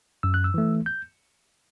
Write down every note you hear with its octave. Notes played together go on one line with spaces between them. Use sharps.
F#2 E6
F#6
E6
E3 A3
G6